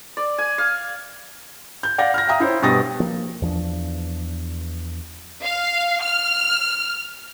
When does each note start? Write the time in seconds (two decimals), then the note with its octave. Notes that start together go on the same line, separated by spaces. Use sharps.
0.17 D5
0.38 G#5
0.58 F5
1.83 G6
1.98 D5 F5 F#5 A#6
2.14 F6 A#6
2.28 E5 F5 G5 A#5 D#6
2.40 E4 C5 C#5
2.62 G2 B2 G4 D#6 A6 A#6
3.00 F3 A#3
3.42 E2 F3 D4
5.43 F5
6.02 F6